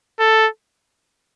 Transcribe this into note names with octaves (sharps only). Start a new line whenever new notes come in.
A4